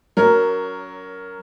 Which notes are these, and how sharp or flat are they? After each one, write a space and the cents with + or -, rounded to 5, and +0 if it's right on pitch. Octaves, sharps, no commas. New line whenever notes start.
F#3 +0 C#4 +25 A#4 +0